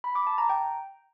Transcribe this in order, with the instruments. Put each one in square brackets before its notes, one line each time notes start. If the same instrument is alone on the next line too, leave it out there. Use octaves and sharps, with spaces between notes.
[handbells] B5
D6
A5
A#5
G5